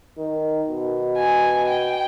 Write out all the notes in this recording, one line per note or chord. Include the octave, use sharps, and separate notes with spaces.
D#3
B2
G#5
G5